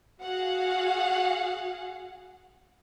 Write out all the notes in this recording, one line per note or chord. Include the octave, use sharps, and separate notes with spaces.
F#4 G#4 F5 F#5